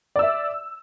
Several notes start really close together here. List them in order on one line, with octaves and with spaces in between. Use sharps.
D5 E6 E5